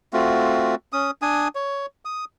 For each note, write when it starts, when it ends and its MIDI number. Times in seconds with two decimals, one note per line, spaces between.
0.13 0.75 57
0.13 0.75 60
0.13 0.75 65
0.13 0.75 66
0.93 1.11 61
0.93 1.11 87
1.22 1.48 62
1.22 1.48 80
1.22 1.48 87
1.55 1.86 73
2.05 2.25 87